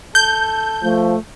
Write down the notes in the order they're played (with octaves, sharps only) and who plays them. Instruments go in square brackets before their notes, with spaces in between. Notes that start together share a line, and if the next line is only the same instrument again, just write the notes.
[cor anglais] A4 [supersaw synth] G6
[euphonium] F3 [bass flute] A3